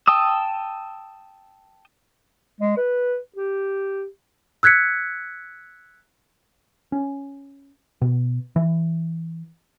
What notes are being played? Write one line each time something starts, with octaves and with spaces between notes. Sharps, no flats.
G5 A5 D#6 E6
G#3
B4
G4
E6 F#6 G#6 B6 C#7
C#4
B2
E3